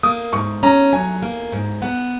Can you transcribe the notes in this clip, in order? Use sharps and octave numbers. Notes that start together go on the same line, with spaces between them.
A#3 D#6
G#2 C#6
C#4 A#5
F#3 G#5
A#3
G#2
B3 F#5